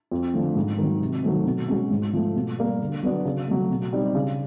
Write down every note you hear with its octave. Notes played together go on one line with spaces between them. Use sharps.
F2
D3 F3 A3
G#2
D#3 F#3
C3
D#3 F#3 A3 C4
B2
G#3 C#4 F#4
G#2
F3 A3
B2
G3 A#3
D3
F#3 B3 D4
C#3
F#3 A3
B2
G3 C4 D#4 G4
C#3